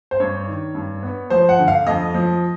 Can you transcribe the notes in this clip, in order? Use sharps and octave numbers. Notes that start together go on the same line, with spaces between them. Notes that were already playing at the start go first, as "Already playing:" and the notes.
C5
G2 C#5
D#3
G2
B3
F3 C5
F#5
D3
F5
F2 D#5
F3